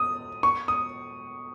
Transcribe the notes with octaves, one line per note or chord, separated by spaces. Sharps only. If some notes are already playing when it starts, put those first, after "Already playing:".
Already playing: D#6
C#6
D#6